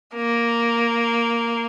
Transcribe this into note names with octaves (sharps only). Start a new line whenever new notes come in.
A#3